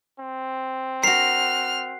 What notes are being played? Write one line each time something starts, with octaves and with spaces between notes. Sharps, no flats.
C4
F#4 A#4 F6 C7